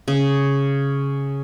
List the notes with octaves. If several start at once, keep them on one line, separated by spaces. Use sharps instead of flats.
C#3